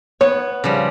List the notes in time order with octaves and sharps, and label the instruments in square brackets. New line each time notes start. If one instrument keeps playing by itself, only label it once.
[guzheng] B3 [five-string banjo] C#5
[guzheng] C#3 F3 G3